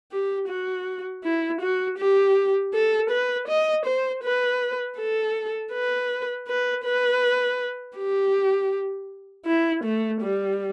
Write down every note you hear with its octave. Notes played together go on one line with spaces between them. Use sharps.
G4
F#4
E4
F#4
G4
A4
B4
D#5
C5
B4
A4
B4
B4
B4
G4
E4
A3
G3